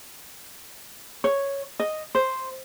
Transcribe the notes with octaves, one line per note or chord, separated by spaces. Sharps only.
C#5
D#5
C5